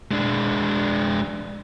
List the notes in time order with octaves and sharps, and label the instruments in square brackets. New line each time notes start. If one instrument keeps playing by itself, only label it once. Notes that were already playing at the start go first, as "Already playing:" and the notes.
[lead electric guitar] G#3 D4